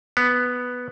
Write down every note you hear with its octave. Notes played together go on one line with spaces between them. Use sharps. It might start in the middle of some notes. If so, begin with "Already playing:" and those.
B3